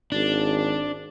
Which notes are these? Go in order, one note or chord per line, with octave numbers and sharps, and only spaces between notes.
G#1 D4